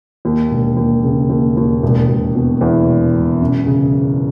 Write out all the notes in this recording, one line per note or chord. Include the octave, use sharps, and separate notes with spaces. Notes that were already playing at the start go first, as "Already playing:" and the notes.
D#2
E1
D#2
C#3
D#2
D#2
E1
E1
B2
E2
E1
E1
F#2
C#3